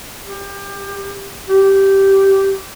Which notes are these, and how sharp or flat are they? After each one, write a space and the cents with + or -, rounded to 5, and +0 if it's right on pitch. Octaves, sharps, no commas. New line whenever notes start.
G4 +25
G4 -10